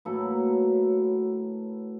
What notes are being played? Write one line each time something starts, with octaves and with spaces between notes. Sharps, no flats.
A2 F#3 A#3 A4 B4